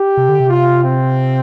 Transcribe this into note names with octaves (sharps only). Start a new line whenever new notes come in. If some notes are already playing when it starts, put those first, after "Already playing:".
Already playing: G4
C3
D3
C3
F4
C4